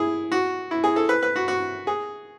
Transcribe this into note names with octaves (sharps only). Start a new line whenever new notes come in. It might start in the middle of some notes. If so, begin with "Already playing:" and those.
Already playing: E4 G#4
F#4
E4
G#4
A4
B4
B4
F#4
F#4
G#4